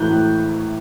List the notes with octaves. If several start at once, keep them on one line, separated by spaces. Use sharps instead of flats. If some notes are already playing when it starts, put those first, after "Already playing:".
Already playing: A2 E3 F#6 G6
A2